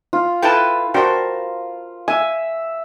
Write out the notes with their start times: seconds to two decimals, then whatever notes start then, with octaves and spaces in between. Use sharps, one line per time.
0.13 F4
0.42 E4 A4 B4 G5 A5
0.94 D4 F#4 A#4 C5 G5
2.08 E5 G#5